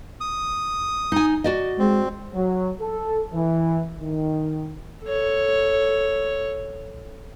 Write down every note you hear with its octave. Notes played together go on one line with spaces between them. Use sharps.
D#6
D#4 G#5
F#4 D5 D#5
G#3 C4
F#3
A4
E3
D#3
A4 C#5